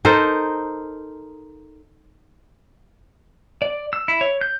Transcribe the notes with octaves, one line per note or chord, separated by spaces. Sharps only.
D#4 A4 A#4 C5
D5
E6
E4
C#5
G6